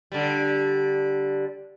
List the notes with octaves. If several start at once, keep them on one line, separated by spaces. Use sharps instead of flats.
D3 G3